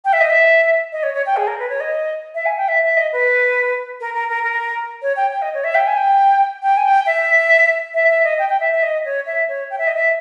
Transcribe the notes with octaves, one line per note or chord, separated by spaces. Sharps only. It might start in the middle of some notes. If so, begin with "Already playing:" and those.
G5
E5
D#5
E5
D#5
C#5
C#5
G5
G#4
A#4
B4
C#5
D#5
E5
G#5
G5
E5
E5
D#5
B4
A#4
A#4
A#4
A#4
C#5
G5
G5
D#5
C#5
E5
G5
G#5
G5
G5
G#5
G5
E5
E5
E5
D#5
G5
G5
E5
E5
D#5
C#5
E5
C#5
G5
E5
D#5
E5